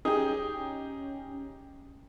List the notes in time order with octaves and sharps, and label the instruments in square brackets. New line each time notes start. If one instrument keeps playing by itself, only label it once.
[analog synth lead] C#4 [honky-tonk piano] D#4 G4 [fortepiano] G#4